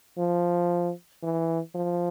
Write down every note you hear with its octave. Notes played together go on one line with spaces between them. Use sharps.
F3
E3
F3